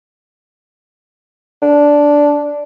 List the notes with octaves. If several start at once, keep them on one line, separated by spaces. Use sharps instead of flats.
D4